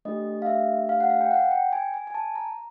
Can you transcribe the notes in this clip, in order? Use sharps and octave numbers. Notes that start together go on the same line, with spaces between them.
A3 D4 G4 D#5
F5
E5
F5
F#5
F5
G5
F#5
G5
G#5
G#5
G#5
A5
A#5